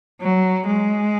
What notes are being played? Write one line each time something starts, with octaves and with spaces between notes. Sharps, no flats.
F#3
G#3